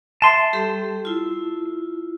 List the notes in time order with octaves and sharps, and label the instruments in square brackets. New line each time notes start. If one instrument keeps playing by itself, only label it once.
[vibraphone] E5 [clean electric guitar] A5 C6
[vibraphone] G3 G4 A4
E4 F4